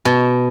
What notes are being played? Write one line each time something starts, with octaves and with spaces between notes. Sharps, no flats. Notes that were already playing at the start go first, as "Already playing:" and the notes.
B2